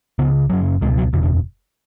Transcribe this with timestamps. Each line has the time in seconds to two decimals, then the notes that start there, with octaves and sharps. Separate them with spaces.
0.19 C#2 C#3 B3
0.50 F#1 F#2 C#3 F#3
0.81 C#2 G#3
0.85 B2
0.97 F#3
1.13 F#1 E2 B2 D3
1.23 D3